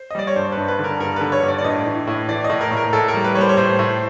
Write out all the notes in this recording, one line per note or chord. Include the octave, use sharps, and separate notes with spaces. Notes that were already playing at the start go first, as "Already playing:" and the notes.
Already playing: C5
D#5
G3 D5
C#5
G2 C5
B4
G2
B4
D3
A#4
G2 A#4
D3 B4
C#5
G2
D5
D5
A2 D#5
E3
A2
E3 D5
D#5
A2
A#4
A2
A#4
A2 A4
A#4
G3
B4
G3 C#5
C5
C#5
A2 C5
A2